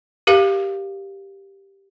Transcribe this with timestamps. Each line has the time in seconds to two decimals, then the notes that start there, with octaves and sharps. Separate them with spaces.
0.27 G4 A#4 F5